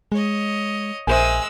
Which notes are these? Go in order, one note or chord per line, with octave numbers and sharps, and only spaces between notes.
G#3 C#5 D#5
A#1 G#3 A#4 C5 E5 G#5 E6